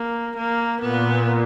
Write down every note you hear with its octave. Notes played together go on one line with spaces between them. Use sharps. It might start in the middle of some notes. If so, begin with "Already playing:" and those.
Already playing: A#3
A#3
A#2 B3